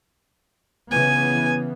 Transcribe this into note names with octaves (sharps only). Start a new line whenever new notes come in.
C#3 E3 B3 G#5